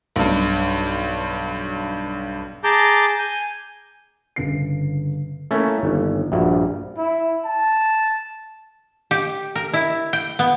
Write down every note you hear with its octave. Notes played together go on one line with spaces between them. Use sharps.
B1 G2
G#4 A5 A#5 D6 G6
G#5 G6
G1 C#3 C7
A3 A#3 C#4 E4 C#6
G1 D#3
A#1 G2 F#4 E5
E4
A5
G4
A#4
E4
G5
B3